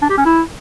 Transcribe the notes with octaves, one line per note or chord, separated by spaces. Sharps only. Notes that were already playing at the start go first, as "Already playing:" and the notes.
D4
G4
C#4
E4